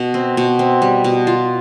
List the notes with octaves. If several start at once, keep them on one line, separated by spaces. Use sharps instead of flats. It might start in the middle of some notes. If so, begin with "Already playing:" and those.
Already playing: B2
C4
B2
C4
G3
B2
F4